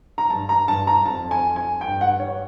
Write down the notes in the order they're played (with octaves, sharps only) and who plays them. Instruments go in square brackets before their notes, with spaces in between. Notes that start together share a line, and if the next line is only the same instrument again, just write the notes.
[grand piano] A#5
[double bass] G2 [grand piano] A5
[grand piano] A#5
[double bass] G2 [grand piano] A5
[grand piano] A#5
[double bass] F2 [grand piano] A5
[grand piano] G#5
G#5
[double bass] G2 [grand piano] G5
[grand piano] F#5
C#5